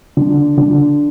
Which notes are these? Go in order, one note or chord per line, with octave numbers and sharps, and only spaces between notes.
D3
D3